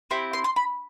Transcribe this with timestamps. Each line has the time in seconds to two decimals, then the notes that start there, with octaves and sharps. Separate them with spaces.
0.11 C4 E4 G4
0.33 C6
0.44 C6
0.56 B5